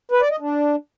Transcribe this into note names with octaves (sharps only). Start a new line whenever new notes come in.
B4
D5
D#5
D4